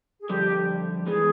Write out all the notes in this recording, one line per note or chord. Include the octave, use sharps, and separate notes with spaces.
G#4
F2 D3 G3 G4
E3 G#3 B3 G#4